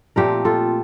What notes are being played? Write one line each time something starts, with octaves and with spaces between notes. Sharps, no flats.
A#2 F3 A3 C4 G4 A#4
F4 A4